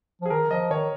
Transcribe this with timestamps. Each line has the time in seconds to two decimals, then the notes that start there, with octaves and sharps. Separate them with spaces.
0.22 F3
0.26 G#4
0.30 D#3 A#4
0.51 F3 D#5
0.70 D#3 C#5